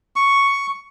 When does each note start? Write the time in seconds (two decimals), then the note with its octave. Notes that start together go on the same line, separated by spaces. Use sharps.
0.16 C#6